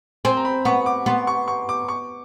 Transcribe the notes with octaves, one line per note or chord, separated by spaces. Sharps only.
C4 G#5
A#5
B5
B3 C#6
D6
B3 C6
C#6
C#6
D6
C#6